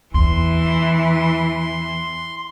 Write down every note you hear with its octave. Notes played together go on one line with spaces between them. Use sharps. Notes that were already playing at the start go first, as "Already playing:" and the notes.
E2 E3 C6